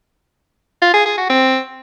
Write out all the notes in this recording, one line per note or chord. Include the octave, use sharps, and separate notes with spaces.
F4
G#4
G#4
F#4
C4